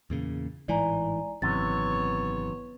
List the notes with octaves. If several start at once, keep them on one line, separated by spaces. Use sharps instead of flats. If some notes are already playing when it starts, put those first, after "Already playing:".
E2 A#2 C#3
A1 G#2 E3 D5 G#5 A#5
G#1 F#2 C3 E3 B3 C#5 A6